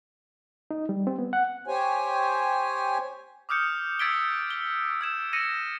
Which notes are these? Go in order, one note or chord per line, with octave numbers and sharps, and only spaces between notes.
D#4
G3
C4
B3
F#5
G4 C5 C#5 G#5
D6 D#6 F6 G6 C#7
E6 G#6 A6 B6 D7 G7
G7
E6 G#6 E7
E6 A#6 C#7 D#7